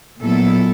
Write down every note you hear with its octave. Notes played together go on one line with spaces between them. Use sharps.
A#2 F#3 B3 E4 A4